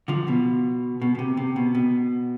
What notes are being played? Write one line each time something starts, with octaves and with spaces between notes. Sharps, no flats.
D3 F3
B2
B2
B2
C3
C3
B2
B2